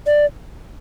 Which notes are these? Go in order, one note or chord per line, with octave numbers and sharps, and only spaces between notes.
D5